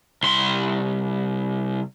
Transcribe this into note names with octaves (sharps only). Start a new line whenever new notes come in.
C2 C6